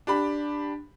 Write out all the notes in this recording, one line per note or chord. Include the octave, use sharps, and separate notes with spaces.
D4 G4 B5